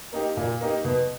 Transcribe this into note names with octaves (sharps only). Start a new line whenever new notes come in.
A#3 D#4 G4
A#2
A#3 D#4 G4
B2